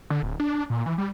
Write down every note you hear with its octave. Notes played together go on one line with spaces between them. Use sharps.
D3
D1
D4
A#2
E3
G3